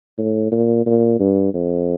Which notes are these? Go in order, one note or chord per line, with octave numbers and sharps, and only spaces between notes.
A2
A#2
A#2
G2
F2